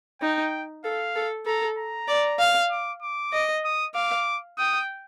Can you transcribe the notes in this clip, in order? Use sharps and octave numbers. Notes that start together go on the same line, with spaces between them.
D#4 G5
A4 F5
A4
A4 A#5
A#5
D5
F5
D6
D6
D#5
D#6
F5 D6
G5 D#6